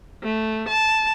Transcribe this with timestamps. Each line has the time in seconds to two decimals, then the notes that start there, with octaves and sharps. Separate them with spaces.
0.23 A3
0.68 A5